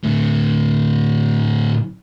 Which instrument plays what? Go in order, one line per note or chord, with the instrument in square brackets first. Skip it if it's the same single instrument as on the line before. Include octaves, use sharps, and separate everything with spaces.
[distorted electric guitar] A2 D3